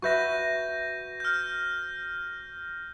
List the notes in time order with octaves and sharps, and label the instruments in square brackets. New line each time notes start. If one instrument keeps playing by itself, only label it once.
[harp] F#4 B4 E5 [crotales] C#6 G6 A#6
[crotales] F6 G6